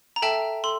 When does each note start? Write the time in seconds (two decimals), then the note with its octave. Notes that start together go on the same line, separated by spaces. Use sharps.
0.16 A#5
0.22 A4 E5 G5 A5
0.64 A4 C6